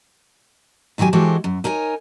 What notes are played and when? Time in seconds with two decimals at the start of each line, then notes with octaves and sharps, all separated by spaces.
0.98 A#2 D#3 F#3 G4 G#5
1.13 E3 G#3 F#4 G4 A4 C5
1.44 F#2
1.64 D#4 A#4 C#5 G#5